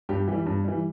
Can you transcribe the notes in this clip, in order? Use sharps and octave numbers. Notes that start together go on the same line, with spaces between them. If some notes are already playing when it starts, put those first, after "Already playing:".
G2 G4
E3 G3 G4
G2
E3 G3